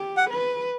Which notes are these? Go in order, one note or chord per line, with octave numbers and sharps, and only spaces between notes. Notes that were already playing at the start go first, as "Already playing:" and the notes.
Already playing: G4
F#5
B4